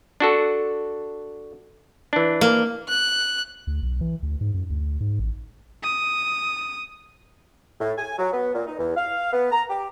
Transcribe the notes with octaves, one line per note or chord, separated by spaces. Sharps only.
D4 F#4 A4
E3 D4
A#3
F#6
D2
B1
E3
D2
G#2
F#2
D2
G#2
A1
D#6
A2
G#5
F#3
B3
A#2
D#4
E2
F5
B3
A#5
G4